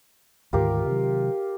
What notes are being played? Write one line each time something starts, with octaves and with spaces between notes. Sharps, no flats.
D2 G#2 D#3 F4 G4 A#4
C3 D#3 F#3